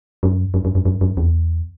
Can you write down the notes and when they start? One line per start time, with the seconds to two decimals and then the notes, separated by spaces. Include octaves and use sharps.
0.23 F#2
0.54 F#2
0.65 F#2
0.75 F#2
0.85 F#2
1.01 F#2
1.17 E2